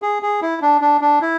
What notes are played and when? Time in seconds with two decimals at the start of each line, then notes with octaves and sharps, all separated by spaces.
0.02 G#4
0.23 G#4
0.42 E4
0.62 D4
0.81 D4
1.01 D4
1.21 E4